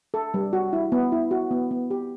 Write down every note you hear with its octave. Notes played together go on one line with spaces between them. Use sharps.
A4
G3
F#4
E4
B3
E4
F#4
B3
B3
G4